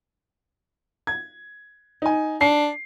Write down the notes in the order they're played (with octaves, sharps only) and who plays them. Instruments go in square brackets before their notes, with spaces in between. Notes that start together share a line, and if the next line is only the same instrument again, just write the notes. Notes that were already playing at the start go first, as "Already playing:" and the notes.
[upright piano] G#6
D#4 G#5
[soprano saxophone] D4 [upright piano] C7